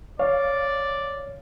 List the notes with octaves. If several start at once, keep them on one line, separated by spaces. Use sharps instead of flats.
C#5 D5 F5